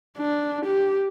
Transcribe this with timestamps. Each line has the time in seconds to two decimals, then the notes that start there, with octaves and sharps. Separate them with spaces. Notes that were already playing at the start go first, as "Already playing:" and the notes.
0.18 D4
0.66 G4